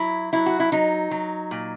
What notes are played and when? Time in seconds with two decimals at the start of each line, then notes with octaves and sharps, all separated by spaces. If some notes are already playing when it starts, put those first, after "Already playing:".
Already playing: F#3 E4
0.33 F#3 E4
0.46 F#4
0.60 E4
0.72 F#3 D#4
1.11 F#3
1.51 A#2